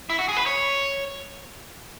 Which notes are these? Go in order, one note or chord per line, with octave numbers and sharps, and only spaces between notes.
E4
F#4
G#4
B4
C#5